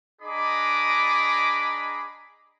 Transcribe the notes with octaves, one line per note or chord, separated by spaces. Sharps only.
D4 G#4 D#5 A#5 B5 D6